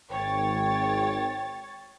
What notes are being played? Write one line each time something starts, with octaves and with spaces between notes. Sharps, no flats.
G#1 C#5 G5 A6